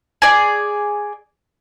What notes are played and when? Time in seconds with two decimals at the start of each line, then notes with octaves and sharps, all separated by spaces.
0.22 G#4 D5